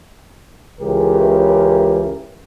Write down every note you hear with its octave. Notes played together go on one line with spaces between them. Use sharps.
C#2 C#3 E3 G4 A#4